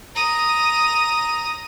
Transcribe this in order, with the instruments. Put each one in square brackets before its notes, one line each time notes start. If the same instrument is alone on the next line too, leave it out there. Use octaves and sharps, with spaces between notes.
[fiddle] A#5 D#6